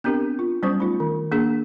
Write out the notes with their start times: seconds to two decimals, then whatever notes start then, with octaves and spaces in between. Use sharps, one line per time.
0.04 B3 C4 D4 G4 A#4
0.39 F4
0.63 F#3 G3 B3 C#4 C5 C#6
0.79 A3 D#4 F4
1.00 D#3
1.32 A#3 D4 G#4